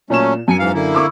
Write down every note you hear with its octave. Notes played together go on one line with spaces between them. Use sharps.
A#2 F#3 A3 C#4 E7
F#2 G#5 C#7
G#2 E3 F5
D3 A#3 E4
C#6 D6 E6